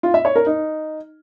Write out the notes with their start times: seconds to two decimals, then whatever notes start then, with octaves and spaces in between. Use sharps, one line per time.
0.03 F4
0.14 E5
0.25 C#5
0.36 A#4
0.46 D#4